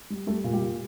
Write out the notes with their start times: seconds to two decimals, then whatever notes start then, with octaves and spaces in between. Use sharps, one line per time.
0.10 G3
0.27 G3 A3 A4
0.44 A#2
0.53 G3 G4
0.62 A#2